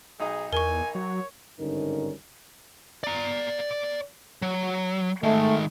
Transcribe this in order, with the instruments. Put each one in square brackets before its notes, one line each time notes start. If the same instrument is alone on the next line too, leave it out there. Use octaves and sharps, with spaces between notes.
[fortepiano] B1 D#4 D#5 [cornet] G#4
[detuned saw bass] E2 [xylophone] A#4 C#6 [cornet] G#5
[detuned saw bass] F#3 [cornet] C#5
[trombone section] G#1 G2 D3 C#4 D#4 A#4
[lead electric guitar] D5 A#5
F#3
[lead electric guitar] D#3 G#3 [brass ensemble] A3